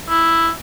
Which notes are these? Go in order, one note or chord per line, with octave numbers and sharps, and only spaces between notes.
E4